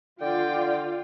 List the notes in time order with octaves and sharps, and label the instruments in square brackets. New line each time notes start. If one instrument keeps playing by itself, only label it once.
[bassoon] D3 [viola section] F4 [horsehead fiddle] D5 G5